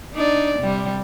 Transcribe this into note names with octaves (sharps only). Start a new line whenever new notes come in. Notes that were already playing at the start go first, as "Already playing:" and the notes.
D4 D#4 D5
C3 G3